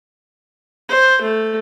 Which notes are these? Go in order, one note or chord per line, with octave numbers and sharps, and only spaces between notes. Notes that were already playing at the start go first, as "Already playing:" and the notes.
C5
A3